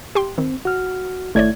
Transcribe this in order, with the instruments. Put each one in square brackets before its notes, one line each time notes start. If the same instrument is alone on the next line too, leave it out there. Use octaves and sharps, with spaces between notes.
[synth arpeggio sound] G4 G5 C6
[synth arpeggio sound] D#3 [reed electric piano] C4
[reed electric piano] F#4 F6
[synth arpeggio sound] G#1 C#5 D5 [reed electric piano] A3 E4 G#6